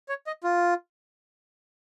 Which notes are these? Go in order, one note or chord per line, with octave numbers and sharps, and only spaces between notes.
C#5
D#5
F4